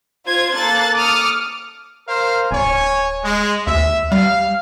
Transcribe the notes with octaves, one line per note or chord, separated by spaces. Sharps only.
F4 C5 G#6
A#3 A4 F#6 A6
D6 D#6 F6 C#7
A#4 C5 F5
D1 C#5 G#5
G#3
D#2 E5
G3 F5